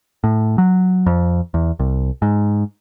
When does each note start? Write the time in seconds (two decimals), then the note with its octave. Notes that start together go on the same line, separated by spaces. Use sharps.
0.24 A2
0.58 F#3
1.06 F2
1.54 E2
1.79 C2
2.22 G#2